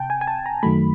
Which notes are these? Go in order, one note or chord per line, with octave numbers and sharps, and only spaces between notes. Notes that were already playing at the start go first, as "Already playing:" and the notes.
Already playing: C3 G5 A5
G#5
G#5
A5
A#5
F#2 D#3 F#3 A3 B5